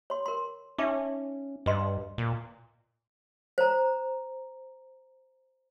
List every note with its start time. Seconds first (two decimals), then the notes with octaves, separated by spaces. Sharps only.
0.10 C#5 C6
0.26 A#4 C6
0.78 C#4 D#4 E5 D6
1.66 G2 B4 D#5 C6
2.18 A#2
3.58 C5 A#5